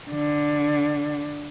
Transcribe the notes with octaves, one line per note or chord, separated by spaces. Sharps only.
D3